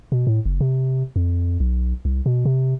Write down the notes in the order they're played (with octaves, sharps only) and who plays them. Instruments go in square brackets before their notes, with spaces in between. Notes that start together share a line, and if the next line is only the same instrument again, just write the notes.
[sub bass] B2
A2
F#1
C3
F2
B1
C2
B2
C3